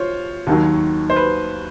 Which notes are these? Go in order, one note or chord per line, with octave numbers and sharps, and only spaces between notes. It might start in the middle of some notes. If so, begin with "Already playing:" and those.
Already playing: F4 C5 C#5
D#2 D#3 F#3
C5
B4